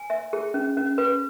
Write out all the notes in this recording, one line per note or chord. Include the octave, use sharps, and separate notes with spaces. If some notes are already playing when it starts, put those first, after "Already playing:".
Already playing: G#5
E5
G#4
C#4
C#4
B4